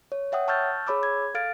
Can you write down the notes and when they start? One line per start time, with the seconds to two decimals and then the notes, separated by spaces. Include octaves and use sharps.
0.12 C#5
0.32 C#5 E5 F#5 G5 D#6
0.48 A5 C#6 E6 F6 G6 A6
0.87 G#4 C#5 B5 D6 E6
1.03 G#6
1.34 A4 F5 F6 A6 D7